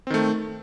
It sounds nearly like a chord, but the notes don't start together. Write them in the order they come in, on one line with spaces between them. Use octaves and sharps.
C4 D#3 A3